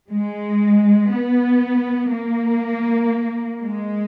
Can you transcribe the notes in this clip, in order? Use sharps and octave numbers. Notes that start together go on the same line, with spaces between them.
G#3
B3
A#3
G#3